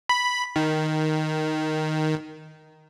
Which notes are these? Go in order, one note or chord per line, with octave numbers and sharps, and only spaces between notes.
B5
D#3